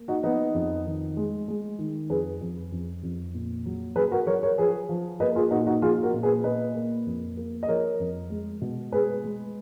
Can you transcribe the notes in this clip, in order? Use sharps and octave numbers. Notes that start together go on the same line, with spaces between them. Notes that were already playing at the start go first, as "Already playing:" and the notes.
Already playing: A#3
D#4 F#4
F3 B3 D#4
F2
D#3
G#3
G#3
D#3
F2 G#4 B4
F2
F2
F2
A#2
F#3
F#3 G#4 B4
F#4 A#4
F#3 A#4 C#5
A#4 C#5
F3 G#4 B4
F3
A#3 B4 D#5
F4 G#4
A#2 D#4 F#4
D#4 F#4
F3 F4 G#4
F#4 A#4
A#2
G#4 B4
A#2 B4 D#5
A#3
F2
A#3
D#5
F3 A#4 C#5
F2
G#3
B2
G#3 G#4 B4
G#3